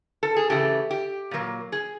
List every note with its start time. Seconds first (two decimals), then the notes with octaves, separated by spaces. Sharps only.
0.23 A4
0.36 G#4
0.50 C#3 E3 A3 G4
0.91 G4
1.31 A#2 F#3 A#3
1.72 G#4